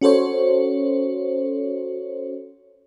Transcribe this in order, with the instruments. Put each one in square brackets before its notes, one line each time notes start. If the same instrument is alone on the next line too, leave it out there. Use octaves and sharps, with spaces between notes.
[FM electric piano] C#4 F#4 A4 C5 C#5